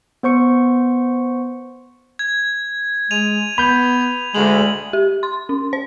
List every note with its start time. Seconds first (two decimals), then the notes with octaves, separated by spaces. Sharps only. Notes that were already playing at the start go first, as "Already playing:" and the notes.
0.23 B3 C5 C#6 C#7
2.19 G#6
3.11 G#3 D#7 F7
3.58 B3 B5 G6 F7
4.34 D2 G#3 F#7
4.93 G4
5.23 C6
5.49 C#4
5.73 C5